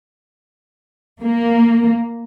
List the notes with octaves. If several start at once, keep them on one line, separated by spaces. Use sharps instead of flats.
A#3